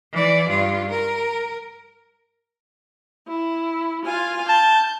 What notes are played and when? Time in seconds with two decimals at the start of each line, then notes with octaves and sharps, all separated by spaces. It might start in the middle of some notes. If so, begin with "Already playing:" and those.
0.13 E3 D5
0.49 G2 F4
0.90 A#4
3.28 E4
4.05 F4 F5 G#5
4.49 A5 G6